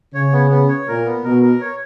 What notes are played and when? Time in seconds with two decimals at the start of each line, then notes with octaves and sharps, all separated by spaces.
0.14 C#3 C#5
0.32 B3
0.50 B3
0.68 C#5
0.87 A#2 A#4
1.05 B3
1.24 B2 A#4
1.42 A#4
1.61 C#5